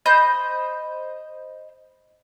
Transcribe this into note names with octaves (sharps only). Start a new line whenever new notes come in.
C5 D#5 B5 G6